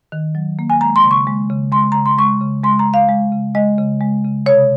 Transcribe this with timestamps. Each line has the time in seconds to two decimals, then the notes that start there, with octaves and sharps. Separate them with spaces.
0.12 D#3
0.35 F#3
0.59 A#3
0.70 G#5
0.81 G#3 A#5
0.96 C6
1.04 C#3
1.11 C#6
1.27 G#3
1.50 C#3
1.72 G#3 C6
1.92 C#3 A#5
2.06 C6
2.18 G#3 C#6
2.41 C#3
2.64 G#3 C6
2.79 A#5
2.87 C#3
2.94 F5
3.09 G#3
3.32 C#3
3.55 G#3 D#5
3.78 C#3
4.01 G#3
4.24 C#3
4.46 C3 C#5